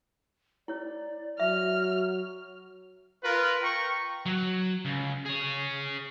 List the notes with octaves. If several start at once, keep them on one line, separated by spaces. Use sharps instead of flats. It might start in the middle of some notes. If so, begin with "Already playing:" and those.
E4 C#5 D5
F#3 E5 F6
F4 A#4 B4
G5 A#5 C#6
F#3
C#2
G#4 C#5